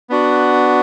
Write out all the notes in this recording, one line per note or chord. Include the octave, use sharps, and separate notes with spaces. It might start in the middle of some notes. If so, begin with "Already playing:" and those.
B3 D4 F#4